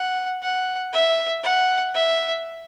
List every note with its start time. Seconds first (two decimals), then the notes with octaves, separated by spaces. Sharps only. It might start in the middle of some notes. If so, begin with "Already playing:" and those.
Already playing: F#5
0.42 F#5
0.93 E5
1.44 F#5
1.94 E5